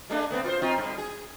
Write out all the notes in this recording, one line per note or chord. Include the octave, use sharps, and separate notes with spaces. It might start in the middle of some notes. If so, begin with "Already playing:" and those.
G#3 A3 D4
A3 B3 C4
F4 B4 C5
C4 D#4 F4
G2
G#4